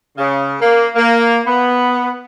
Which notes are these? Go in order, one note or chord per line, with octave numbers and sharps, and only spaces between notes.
C#3
A#3
A#3
B3